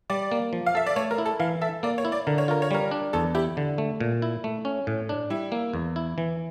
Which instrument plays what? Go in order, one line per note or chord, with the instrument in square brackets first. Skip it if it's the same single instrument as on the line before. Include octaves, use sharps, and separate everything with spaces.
[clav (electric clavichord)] G3 [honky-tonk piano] D5
[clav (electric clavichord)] A#3
F3
[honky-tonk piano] F5
[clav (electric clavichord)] A4 [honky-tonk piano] E5
[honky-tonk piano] D5
[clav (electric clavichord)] A3 [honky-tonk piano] C#5
[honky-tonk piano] A#4
[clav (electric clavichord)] E4
[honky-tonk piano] A4
[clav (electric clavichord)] E3 [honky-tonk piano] F5
[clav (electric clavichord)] A4 [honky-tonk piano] E5
[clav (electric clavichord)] A#3 [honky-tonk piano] D5
[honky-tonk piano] C#5
[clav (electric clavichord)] E4
[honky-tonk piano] D5
[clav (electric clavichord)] D3 [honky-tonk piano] A#4
[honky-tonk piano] C#5
[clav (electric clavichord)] F4 [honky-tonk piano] A#4
[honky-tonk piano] C#5
[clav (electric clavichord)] G3 [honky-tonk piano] A#4
[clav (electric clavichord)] D4
[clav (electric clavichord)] E2 [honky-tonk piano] A4
[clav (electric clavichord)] E4 [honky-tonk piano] G4
[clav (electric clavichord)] D3
A3
A#2
E4
A3
C#4
A2
D4
[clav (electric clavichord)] G3 [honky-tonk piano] E4
[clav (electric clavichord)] A#3
E2
E4
E3